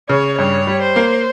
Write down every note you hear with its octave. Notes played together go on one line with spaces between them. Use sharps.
C#3 C#5
G2 C#5
G3
C5
A#3